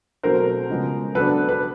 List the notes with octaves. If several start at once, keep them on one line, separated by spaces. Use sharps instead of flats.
B2 F#3 A3 C4 A#4 C5
C#3 F3 G#3 B3
F#3 B3 D4 A4 B4
B4